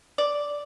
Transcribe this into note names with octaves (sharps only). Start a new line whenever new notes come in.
D5